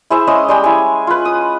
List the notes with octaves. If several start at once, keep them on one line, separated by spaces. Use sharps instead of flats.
E4 G#4 C5 E5
G#3 C#4 D#5 D#6
G3 G#3 G5
E4 G#5
F4 B4
D#6